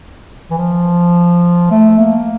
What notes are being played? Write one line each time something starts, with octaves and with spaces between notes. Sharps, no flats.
E3
F3
A3
A#3